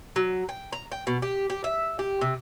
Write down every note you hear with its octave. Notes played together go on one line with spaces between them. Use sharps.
F#3
G5
A#5
G5
B2
G4
G4
E5
G4
C3